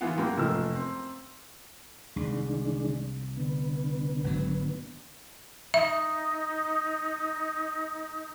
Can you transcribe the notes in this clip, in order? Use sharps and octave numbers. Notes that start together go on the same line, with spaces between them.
E3 B3 F4 F5 F#5
F#2 A#3 G5
F1 F3 E6
C4
C2 D#3 G#3 D4
D3 B3
G#1 F#3
D#4 E5